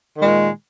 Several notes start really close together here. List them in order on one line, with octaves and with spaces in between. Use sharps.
D#3 G#3 A#2